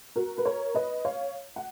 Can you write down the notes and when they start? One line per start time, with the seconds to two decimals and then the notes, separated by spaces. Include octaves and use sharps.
0.16 F#4 A#4
0.38 B4
0.45 A#4 C#5
0.75 B4 D#5
1.05 C#5 F5
1.56 F#5